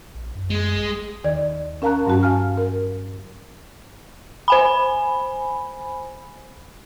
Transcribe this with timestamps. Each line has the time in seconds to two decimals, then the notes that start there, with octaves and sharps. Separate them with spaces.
0.14 A#1
0.35 F#2
0.50 G#3
0.75 G#1
1.24 D#2 D#3 D5 G#6
1.82 C#4 A#4 F5 A5 A#5 F#6
2.06 G2 F#3 C#4 F#4 A5
2.23 F5 G#5 F6
2.58 A#4
4.48 C5 G#5 B5